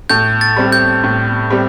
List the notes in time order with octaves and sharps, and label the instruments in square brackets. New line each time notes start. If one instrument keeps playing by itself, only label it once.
[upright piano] A2 [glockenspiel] G6
[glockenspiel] A6
[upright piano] G3 C4 G4
[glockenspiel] G6
[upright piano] A2
G3 C4 G4